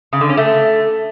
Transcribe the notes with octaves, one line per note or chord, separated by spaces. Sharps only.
C#3
D3
C#4
A3